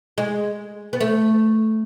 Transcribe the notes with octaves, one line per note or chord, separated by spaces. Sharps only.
G#3
B3
A3